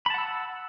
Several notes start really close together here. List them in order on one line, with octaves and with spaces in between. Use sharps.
B5 A5 F#5 E6